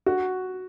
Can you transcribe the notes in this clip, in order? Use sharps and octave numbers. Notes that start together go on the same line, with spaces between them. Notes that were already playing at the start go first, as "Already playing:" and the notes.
F#4